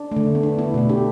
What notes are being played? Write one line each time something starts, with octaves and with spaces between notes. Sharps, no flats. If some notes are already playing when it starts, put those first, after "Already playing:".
Already playing: D4
D3 A3
B3
D4
B3 E4
B2 A3
D4 G4